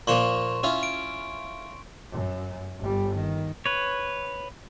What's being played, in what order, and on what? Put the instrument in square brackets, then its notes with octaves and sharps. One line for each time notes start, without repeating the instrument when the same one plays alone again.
[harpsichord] A#2 F3 A#3 [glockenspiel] C6 C#6 E7
[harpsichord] C#4 E4 F4
[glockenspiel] D7
[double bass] F#2
G1 G3
D#3
[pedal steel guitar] B4 C#5